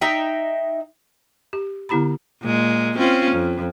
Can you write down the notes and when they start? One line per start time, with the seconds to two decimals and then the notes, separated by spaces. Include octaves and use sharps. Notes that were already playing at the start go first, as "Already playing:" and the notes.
0.01 D#4 E5 G5
1.53 G4
1.89 D3 B3 E4 G4 A#5 B5
2.42 A#2 G#3
2.98 C4 C#4 F4
3.31 F2